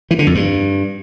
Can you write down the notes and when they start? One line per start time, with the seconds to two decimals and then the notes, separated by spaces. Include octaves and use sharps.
0.11 E3
0.19 D3
0.27 F2
0.35 G2